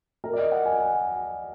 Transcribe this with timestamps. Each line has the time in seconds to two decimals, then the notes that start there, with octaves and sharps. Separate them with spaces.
0.24 A#4
0.33 D5
0.38 D#5
0.52 F#5
0.66 G#5
0.78 G#5